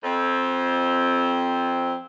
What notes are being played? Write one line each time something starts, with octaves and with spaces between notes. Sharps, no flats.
F2 C4